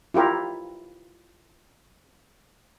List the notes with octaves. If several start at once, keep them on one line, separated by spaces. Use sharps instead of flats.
E4 F4 G4 A#4